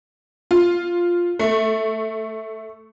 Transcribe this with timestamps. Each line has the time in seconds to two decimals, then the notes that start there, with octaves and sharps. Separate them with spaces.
0.51 F4
1.39 A3